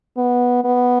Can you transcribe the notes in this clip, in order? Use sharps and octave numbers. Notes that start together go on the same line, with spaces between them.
B3
B3